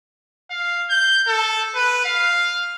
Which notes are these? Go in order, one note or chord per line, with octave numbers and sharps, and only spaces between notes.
F5
G6
A4
B4
F5